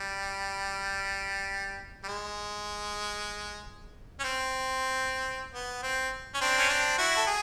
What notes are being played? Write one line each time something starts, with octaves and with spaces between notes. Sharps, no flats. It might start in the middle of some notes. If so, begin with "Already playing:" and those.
Already playing: G3
G3
G#3
C#4
C4
B3
C4
C#4
C4 D4
C#4
C4 D4
E4 F#4
A4
G#4